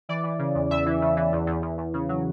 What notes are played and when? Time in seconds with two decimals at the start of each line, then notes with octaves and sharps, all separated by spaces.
0.09 E3 D5
0.24 E3
0.39 C#3
0.55 E2
0.71 E2 E5
0.86 E3
1.02 C#3
1.17 E3
1.33 E2
1.47 E2
1.62 E2
1.78 E2
1.94 C#3
2.09 F#3